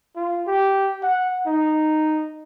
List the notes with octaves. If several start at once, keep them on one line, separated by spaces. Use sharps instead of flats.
F4
G4
F#5
D#4